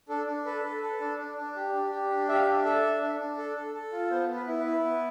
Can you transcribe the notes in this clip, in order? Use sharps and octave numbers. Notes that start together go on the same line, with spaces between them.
D4 A4
D4
A4 B4
A4
A4
D4
D4
D4
G4
D4
G4
D4
G4 E5
F5
E5
D4
A4 E5
D4
D4
D4
A4
A4
A4
F4
B3 C5
B3
B4
E4
B4
E4
B3